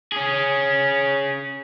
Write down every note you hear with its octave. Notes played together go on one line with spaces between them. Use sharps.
C#4 G#4